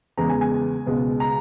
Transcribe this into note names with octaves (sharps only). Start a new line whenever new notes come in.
E2 C#3 G#3 B3 A#5
G#5
G#5
C#2 B2 G#3 B3
A#5